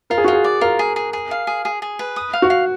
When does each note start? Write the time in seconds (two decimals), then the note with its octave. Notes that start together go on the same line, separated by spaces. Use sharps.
0.10 F4 A#4
0.18 G#4
0.24 F#4
0.28 F4 G#4
0.44 D5
0.61 F4 A#4
0.79 G#4
0.96 G#4
1.13 G#4
1.31 F5
1.47 G#4
1.65 G#4
1.82 G#4
1.99 B4
2.16 D#6
2.33 F5
2.42 F#4
2.50 F5